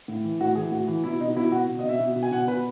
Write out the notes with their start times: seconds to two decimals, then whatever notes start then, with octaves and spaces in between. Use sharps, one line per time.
0.08 A2
0.24 E3
0.40 A2 F#4
0.55 E3 G#4
0.72 A2 F#4
0.87 E3
1.04 B2 E4
1.19 B2 D#4
1.36 B2 E4
1.51 B2 F#4
1.68 B2
1.79 D#5
1.83 B2
1.89 E5
2.00 B2
2.16 B2
2.23 G#5
2.31 B2 F#5
2.47 B2 B4